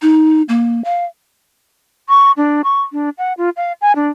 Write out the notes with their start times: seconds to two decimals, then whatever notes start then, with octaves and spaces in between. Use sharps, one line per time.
0.02 D#4
0.49 A#3
0.84 F5
2.09 C#6
2.37 D4
2.64 C#6
2.93 D4
3.18 F#5
3.38 F4
3.57 F5
3.81 G#5
3.96 D4